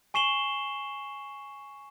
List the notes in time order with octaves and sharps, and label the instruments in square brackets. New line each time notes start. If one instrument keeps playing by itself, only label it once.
[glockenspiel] G#5 C#6 C7 E7 F#7 G7